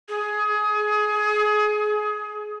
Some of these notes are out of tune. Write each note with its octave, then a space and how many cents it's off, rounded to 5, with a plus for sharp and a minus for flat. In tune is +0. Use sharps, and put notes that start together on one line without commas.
G#4 +25